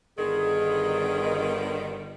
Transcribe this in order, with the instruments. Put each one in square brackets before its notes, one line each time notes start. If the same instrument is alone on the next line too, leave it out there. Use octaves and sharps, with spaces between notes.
[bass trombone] G1 [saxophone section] D3 D#3 [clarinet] G#4